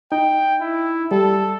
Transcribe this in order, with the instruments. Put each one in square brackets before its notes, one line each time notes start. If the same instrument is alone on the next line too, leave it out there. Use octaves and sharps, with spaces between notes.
[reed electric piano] D#4 [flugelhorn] G5
[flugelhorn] E4
[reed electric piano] G3 [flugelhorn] A4